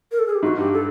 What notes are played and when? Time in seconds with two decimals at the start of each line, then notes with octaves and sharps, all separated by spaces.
0.12 A#4
0.19 A4
0.27 G#4
0.35 G4
0.43 G#2 F#4
0.58 G2 G4
0.73 A4